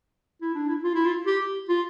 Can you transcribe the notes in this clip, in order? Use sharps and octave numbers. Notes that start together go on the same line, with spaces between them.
E4
D4
E4
F4
E4
F4
G4
F4